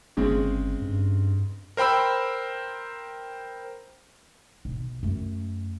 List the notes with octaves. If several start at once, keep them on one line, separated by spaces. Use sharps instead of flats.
G1 C#3 G#3 C4
G2
A#4 C5 G5 B5 E6
B1
F#2 A3